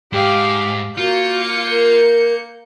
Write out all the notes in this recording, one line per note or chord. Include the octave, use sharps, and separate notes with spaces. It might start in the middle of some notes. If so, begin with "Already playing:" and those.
G#2 G4 F5
A#3 F4 F#4 G6 C#7
A#4